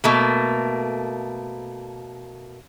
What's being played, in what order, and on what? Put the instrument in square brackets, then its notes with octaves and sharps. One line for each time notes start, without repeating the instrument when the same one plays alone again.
[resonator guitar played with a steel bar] B2 A3 A#3